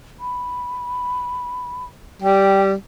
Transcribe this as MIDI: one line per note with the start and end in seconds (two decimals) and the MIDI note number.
0.20 1.84 83
2.22 2.74 55
2.22 2.61 79